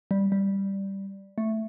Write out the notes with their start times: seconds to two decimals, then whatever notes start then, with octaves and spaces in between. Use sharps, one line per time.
0.11 G3
0.32 G3
1.38 A3